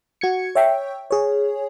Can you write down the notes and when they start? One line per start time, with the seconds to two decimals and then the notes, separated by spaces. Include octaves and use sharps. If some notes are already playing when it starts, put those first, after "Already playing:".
0.21 F#4 G#6 C#7
0.55 C#5 E5 G5
1.11 G#4 C#5